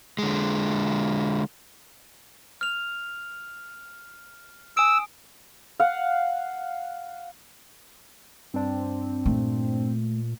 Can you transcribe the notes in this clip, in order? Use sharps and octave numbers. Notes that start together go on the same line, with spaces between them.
D3 G#3
F6 F7
G#5 D#6 E6 D7
F5 F#5
G2 C4 D4
A#2 A3